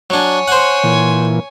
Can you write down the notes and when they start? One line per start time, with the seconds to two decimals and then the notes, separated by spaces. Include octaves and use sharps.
0.10 F#3 D4 C#5 G#5
0.48 C5 F#5
0.84 A#2 E3